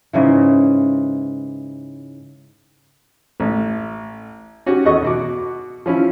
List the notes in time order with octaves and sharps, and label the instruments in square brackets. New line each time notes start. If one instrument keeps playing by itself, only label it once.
[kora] G#2 C#3 E3
[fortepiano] A1
C#4 F#4 G4
E2 F#4 A4 D#5 C#6
B2 F#4 D6
F3 C#4 E4